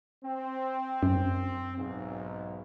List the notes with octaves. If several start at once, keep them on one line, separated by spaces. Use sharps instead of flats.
C4
F#2
B1 G#2